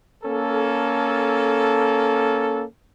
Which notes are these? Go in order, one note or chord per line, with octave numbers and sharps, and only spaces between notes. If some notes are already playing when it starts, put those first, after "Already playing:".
A#3 C#4 A4